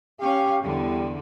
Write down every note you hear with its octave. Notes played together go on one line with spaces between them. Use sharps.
C#4 G4 F5
E2 D3 G3